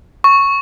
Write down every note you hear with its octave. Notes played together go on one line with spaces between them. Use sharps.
C#6